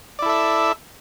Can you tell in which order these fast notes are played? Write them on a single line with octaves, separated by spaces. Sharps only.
D5 E4 A4 E5